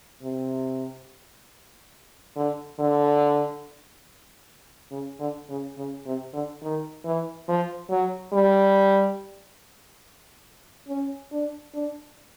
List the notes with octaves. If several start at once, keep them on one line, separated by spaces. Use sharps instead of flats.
C3
D3
D3
C#3
D3
C#3
C#3
C3
D3
D#3
E3
F3
F#3
G3
C#4
D4
D4